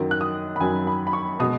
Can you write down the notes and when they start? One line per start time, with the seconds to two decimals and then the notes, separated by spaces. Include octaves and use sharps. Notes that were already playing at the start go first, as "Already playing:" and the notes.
Already playing: F#2 D#3 F#3
0.11 F#6
0.21 D#6
0.56 B5
0.61 F#2 D#3 F#3 G#5
0.87 B5
1.07 B5
1.13 C#6
1.40 B2 G#3 D#6